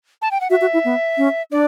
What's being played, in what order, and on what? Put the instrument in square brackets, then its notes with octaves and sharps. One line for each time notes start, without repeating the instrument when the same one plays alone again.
[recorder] A5
G5
F#5
[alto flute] F#4 [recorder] E5
[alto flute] F#4
E4
B3
C#4
[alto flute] D4 [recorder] D5